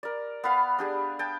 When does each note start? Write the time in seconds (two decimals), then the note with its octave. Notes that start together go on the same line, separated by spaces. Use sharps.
0.03 A#4 D5
0.44 B3 B4 F5 B5
0.79 D4 G4 G#4
1.19 G5 A5